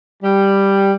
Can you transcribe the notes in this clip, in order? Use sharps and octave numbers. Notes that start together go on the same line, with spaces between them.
G3